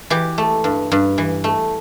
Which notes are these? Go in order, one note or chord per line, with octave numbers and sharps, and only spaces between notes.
E3 G4
A3
G2
G2
E3
A3